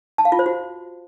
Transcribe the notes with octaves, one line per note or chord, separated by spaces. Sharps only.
A5
F5
F4
C5
F#4